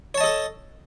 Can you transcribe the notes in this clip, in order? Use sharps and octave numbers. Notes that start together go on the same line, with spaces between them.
A4 C#5 D#5 A5